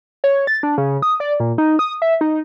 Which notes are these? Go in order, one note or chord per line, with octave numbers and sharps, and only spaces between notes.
C#5
A6
D4
C#3
D#6
D5
A#2
D#4
D#6
E5
D#4